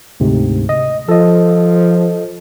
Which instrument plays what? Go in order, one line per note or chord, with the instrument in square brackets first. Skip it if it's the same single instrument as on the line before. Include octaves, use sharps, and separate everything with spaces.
[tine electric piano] D2 G#2 C3
D#5
[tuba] F3 [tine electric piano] A4 D#5